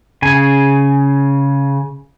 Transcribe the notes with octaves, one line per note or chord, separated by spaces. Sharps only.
C#3 G#5